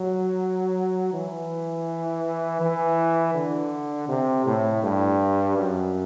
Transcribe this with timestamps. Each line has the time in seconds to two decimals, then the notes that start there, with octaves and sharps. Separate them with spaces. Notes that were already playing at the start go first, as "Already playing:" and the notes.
Already playing: F#3
1.13 E3
2.60 E3
3.34 D3
4.09 C3
4.46 A2
4.83 G2
5.57 F#2